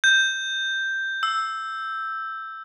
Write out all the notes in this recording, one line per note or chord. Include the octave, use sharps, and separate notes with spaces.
G6
E6